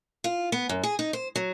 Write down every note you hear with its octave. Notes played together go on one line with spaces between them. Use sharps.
F4
B3
F#2
G#4
D#4
C5
F#3